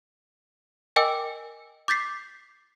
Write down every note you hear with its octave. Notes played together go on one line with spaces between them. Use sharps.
A#4 D#5 G5 G#5 D6 E6
D6 G6 A6 B6 C7